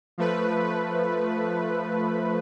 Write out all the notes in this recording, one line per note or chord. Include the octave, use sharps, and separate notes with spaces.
F3 A3 B4